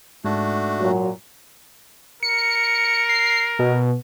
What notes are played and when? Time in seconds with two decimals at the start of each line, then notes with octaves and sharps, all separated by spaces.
0.25 G#2 A3 D4 F#4
0.80 A#2 F#3
2.23 A#4 C#7
3.09 C7
3.59 B2